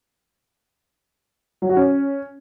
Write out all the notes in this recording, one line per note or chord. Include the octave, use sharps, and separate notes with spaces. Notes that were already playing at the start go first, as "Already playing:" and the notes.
F#3
F#4
C#4